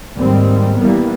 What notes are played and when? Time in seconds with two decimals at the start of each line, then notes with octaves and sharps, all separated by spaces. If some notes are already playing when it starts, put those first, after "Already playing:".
0.16 D#2 G#2 G3 C4
0.79 E3 G3 A#3 B3